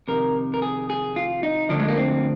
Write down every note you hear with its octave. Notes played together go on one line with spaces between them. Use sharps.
F2 C3 D#3 A#4
A#4
G#4
G#4
F4
D#4
D2 D3 F3 D4
G#3
A#3
C4